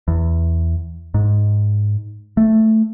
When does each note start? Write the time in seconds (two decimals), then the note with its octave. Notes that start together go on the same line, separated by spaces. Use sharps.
0.08 E2
1.14 G#2
2.37 A3